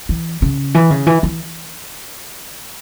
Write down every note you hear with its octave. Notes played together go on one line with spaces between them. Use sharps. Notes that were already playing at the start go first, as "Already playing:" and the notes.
E3
C#3
E3
C#3
E3
E3